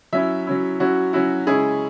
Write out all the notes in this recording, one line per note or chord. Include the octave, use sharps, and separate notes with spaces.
F#3 C#4 E4 E5
F#3 C#4 E4
F#3 C#4 E4 F#4
F#3 C#4 E4 F#4
C#3 G#3 C#4 E4 G#4